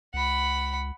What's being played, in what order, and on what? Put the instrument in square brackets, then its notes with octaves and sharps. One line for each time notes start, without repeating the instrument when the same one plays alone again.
[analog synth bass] C#2 [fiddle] F#5 B5